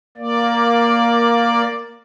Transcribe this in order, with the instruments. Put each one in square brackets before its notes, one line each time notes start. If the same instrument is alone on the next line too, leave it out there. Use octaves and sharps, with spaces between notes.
[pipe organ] A#3 D5